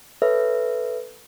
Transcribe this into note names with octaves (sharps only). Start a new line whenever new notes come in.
A4 B4 C#5 E5